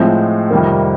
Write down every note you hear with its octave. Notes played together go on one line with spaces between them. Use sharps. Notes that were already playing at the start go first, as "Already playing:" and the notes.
Already playing: A2 F3 G#3 C4
F2 C3 D#3 G3 A#3